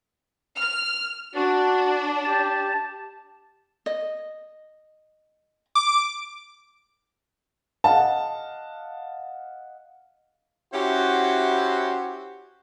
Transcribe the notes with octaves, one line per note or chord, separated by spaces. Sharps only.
F6
D4 F#4
G4 A5
D#5
D6
D#5 F5 F#5 A5
C#4 E4 F#4 G4 C5 E5